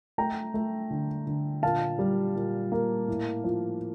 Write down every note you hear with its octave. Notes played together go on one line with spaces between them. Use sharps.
A3 G5 A#5
A3
D3
D3
A#2 F5 A5
G3
A#2
A#3
A2
F3